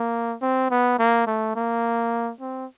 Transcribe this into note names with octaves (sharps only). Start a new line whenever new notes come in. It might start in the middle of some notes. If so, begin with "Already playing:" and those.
Already playing: A#3
C4
B3
A#3
A3
A#3
C4